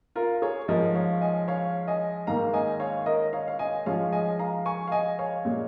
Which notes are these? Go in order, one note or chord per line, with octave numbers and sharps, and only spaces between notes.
F4 A#4
G#4 C#5
G#2 F3 G#3 A#4 D#5
C#5 F5
D#5 G#5
C#5 F5
D#5 G#5
G#2 D#3 A#3 F5 A#5
D#5 G#5
C#5 F5
A#4 D#5
C#5 F5
F5
D#5 G#5
G#2 F3 G#3 C#5 F5
D#5 G#5
F5 A#5
G#5 C#6
F5
D#5 G#5
C#5 F5
A#2 G#3